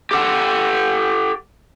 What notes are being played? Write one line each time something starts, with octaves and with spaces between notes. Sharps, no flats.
G4 A4 F#5